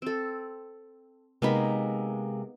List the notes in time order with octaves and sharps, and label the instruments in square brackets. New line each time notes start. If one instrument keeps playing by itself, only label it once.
[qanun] C4 A4
[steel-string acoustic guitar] C3 G#3 A#3 [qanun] B3 D#4 B5